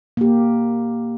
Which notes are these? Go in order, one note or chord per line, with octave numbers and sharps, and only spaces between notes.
A#3 G4